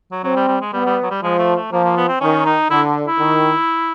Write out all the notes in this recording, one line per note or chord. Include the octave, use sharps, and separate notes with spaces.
F#3
F#3 C4
G3
G3
G#3
G3 B3
G3
F#3
G3
F3 G#3
A3
A3
F3 A#3
A#3
B3
C4
D#3 C#4
D#4
D3 E4
E4
D#3